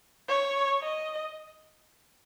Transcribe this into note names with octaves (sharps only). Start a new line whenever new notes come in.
C#5
D#5